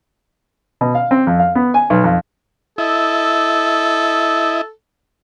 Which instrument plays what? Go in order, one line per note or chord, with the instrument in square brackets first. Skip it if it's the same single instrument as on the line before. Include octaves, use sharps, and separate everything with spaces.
[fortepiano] B2
F5
C4
F2
F5
B3
G#5
B1
F2
[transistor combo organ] E4 D#5 [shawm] A4